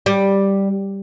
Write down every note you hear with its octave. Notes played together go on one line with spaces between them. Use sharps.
G3